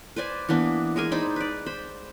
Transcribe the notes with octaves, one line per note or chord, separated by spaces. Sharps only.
B4 C5 D5 G#5
E3 A#3 B3 D4
G#3 G#4 A#4 G#5
D#4 C5 D5 B5
B4 D5
C5 B5